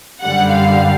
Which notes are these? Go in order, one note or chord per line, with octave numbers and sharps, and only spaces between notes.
F#2 D3 G3 F#5
F5